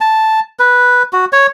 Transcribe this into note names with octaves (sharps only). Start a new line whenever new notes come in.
A5
B4
F#4
C#5